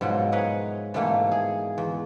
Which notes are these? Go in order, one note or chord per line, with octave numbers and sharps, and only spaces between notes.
G#2 B2 F3 F#3 E4
G#4 A#4 B4 C#5 D#5
G#2 B2 E3 A3 A#3 E4
G#4
E2